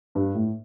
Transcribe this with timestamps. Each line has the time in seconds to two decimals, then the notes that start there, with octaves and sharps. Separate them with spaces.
0.15 G2
0.34 A2